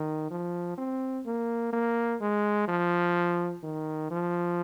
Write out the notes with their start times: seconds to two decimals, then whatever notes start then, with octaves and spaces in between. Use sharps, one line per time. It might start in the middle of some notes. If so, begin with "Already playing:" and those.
Already playing: D#3
0.31 F3
0.78 C4
1.26 A#3
1.73 A#3
2.21 G#3
2.68 F3
3.63 D#3
4.11 F3